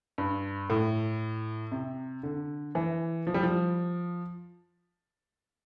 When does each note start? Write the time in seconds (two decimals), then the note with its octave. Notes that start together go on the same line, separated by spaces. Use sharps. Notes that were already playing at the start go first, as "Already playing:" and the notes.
0.18 G2
0.70 A2
1.72 C3
2.23 D3
2.75 E3
3.27 F3
3.34 G3
3.43 F3